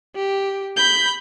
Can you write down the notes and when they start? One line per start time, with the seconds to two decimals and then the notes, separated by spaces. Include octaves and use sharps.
0.15 G4
0.77 B5 G6